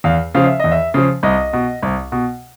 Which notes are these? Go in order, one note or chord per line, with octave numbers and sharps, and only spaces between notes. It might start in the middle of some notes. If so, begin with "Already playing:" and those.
E2 F5
C#3 F3 F5
E5
E2 D#5
E5
C#3 F3
C2 D#5
B2
C2
B2